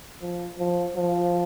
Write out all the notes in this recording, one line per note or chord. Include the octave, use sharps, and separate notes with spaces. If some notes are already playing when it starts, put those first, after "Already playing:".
F3
F3
F3